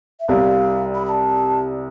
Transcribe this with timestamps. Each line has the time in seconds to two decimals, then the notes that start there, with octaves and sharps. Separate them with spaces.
0.20 E5
0.28 C2 C3 G3 F5
0.94 B5
1.05 B5
1.09 A5